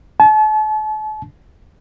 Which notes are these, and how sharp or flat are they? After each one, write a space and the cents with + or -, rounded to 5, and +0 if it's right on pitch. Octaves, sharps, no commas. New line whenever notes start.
A5 -40